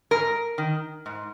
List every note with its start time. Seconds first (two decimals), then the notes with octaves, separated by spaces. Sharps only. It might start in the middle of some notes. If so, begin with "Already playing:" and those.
0.11 G#2 A#4
0.58 D#3
1.06 G#2